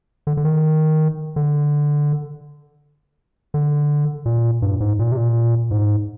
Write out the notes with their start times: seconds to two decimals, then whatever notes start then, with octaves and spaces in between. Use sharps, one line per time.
0.27 D3
0.37 D3
0.44 D#3
1.36 D3
3.54 D3
4.26 A#2
4.62 G2
4.80 G#2
4.99 A#2
5.12 C3
5.17 A#2
5.71 G#2